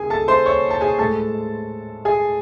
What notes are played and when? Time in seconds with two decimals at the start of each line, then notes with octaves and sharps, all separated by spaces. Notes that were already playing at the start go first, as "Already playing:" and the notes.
Already playing: D#2 C#3 G#4 G#5
0.10 A4 A5
0.28 C5 C6
0.46 C#5 C#6
0.70 A5
0.81 G#4 G#5
0.99 A2 G#3 A4 A5
2.05 G#4 G#5